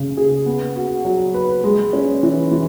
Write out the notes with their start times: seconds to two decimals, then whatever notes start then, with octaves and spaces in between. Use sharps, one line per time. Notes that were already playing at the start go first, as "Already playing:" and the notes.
Already playing: C#3
0.17 G#4
0.46 B3
0.76 F#4
1.05 F#3
1.34 B4
1.64 G#3
1.93 C#4
2.23 E3
2.52 E3